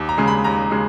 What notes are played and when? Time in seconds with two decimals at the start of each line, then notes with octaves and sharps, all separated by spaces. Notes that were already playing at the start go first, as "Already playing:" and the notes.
Already playing: D#2
0.09 A#5
0.18 C#3 G#3
0.28 B5
0.44 D#2 A#5
0.71 C#3 G#3